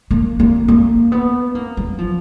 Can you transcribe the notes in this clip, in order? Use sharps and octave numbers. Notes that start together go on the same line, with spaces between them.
A#3
A#3
A#3
B3
A#3
F#3
F3